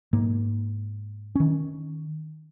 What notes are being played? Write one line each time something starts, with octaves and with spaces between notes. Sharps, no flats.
G#2 A#3
D#3 C#4